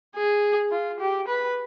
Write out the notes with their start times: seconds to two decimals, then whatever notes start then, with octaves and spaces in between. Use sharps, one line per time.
0.15 G#4
0.71 F4
1.00 G4
1.28 B4